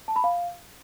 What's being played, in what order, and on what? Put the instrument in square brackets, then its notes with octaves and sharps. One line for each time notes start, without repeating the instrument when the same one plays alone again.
[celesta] A5
B5
F5